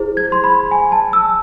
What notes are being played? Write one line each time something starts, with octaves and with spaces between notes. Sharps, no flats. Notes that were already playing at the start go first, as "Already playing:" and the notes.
Already playing: E4 G#4 C5
G#6
C6
B5
G#5
A5
E6